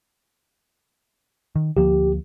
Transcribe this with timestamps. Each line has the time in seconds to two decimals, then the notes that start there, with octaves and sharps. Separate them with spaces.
1.56 D#3
1.77 D2 F3 A#3 G4